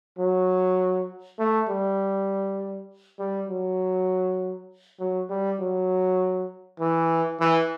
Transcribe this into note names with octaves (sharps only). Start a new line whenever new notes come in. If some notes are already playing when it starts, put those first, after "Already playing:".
F#3
A3
G3
G3
F#3
F#3
G3
F#3
E3
E3